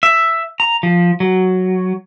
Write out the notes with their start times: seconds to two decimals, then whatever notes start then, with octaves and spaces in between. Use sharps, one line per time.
0.03 E5
0.60 A#5
0.83 F3
1.20 F#3